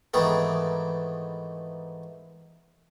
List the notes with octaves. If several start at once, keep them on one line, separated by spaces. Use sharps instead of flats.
G#2 D#3 E3 A3 B3